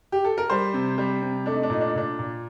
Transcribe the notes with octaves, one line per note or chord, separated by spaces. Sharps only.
G4
A4
A#4
G3 C5
C3
G3
C3
A3 D4
D#4
D4
A#2 D#4
D4
D#4
A#2 D4
A#2